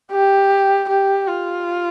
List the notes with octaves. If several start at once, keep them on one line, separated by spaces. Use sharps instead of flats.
G4
G4
F4